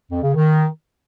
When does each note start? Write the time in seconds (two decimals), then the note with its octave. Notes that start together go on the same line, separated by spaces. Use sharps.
0.11 F2
0.23 C#3
0.34 D#3